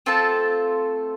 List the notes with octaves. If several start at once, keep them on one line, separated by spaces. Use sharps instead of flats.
A3 C4 F4 A4 A5